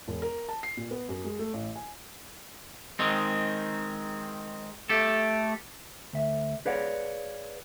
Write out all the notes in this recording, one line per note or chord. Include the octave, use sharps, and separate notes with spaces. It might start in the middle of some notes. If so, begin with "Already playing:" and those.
E1
A#4
A5
C7
A#2
B3
F#2
G#3
A3
A1
G#5
D#3 G#3 C4
A3 G4 A4
D2 E5
G#4 B4 C#5 D5 F5 F#5